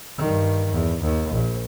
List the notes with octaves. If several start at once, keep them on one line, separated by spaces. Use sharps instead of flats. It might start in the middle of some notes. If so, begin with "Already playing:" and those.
G2 D#3
E2
D#2
A#1